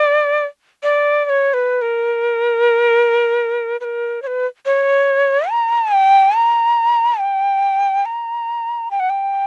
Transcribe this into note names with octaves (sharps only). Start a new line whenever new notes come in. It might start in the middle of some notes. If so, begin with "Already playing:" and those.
Already playing: D5
D5
D5
C#5
B4
A#4
B4
A#4
C#5
B4
C#5
A#5
G5
A#5
G5
A#5
G5
F#5
G5